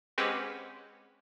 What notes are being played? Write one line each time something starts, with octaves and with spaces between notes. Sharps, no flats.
G#3 C4 C#4 F#4 G4 B4